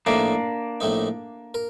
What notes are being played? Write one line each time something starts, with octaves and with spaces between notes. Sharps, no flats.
A#1 A2 A3 A#3 D4 D#4
A#1 A2 A3 D#4
A#4